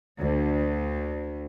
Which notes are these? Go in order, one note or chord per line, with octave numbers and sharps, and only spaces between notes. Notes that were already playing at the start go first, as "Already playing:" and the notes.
D2